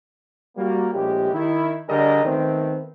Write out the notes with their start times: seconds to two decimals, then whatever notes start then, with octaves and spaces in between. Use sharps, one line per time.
0.57 G3 A#3 F#4
0.94 A#1 A2 G#3 G4
1.33 D#3 E4
1.89 D3 G3 D4 G#4 A#4 D#5
2.25 D#3 A3 B3 C4